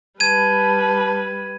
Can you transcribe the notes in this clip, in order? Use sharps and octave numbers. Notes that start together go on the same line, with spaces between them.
G3 B4 A5 G#6 D#7